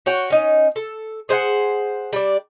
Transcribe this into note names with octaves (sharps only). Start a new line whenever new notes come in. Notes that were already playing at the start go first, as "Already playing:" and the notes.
F#4 C#5 G5
C#4 D#4
A4
G#4 C5 F5 F#5
G3 D4